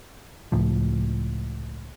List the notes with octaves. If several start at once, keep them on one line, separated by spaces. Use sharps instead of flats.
C#2 A2 F3